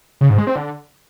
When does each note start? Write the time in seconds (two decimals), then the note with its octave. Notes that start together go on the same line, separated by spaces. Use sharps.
0.21 C#3
0.30 G#2
0.38 G#3
0.47 C4
0.56 D3